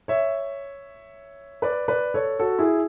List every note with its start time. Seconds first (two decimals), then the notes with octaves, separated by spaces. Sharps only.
0.08 C#5 E5
1.62 B4 D5
1.88 B4 D5
2.14 A4 C#5
2.39 F#4 A4
2.59 E4 G#4